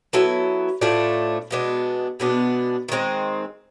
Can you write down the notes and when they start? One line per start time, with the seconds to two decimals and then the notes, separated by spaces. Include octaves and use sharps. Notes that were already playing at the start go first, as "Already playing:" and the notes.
0.13 F#3 B3 E4 A4
0.81 A2 F3 A3 D4
1.51 B2 G#3 B3 D4
2.20 B2 G#3 B3 D4
2.88 D#3 G#3 C4